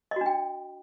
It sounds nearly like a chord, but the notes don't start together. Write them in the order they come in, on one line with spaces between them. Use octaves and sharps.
D#5 F#4 D4 G5